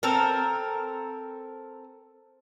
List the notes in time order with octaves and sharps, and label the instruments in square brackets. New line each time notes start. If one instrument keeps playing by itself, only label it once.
[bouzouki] C4 A4 A#4